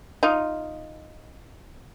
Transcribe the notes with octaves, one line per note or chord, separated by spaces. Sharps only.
D#4 F4